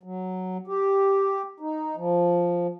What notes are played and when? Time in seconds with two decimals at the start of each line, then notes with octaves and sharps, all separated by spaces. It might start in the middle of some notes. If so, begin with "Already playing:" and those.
0.03 F#3
0.67 G4
1.60 D#4
1.97 F3